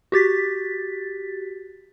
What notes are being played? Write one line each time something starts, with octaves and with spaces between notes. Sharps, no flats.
F#4 G4 A6 B6